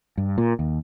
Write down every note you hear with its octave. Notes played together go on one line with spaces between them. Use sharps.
G2
A#2
D#2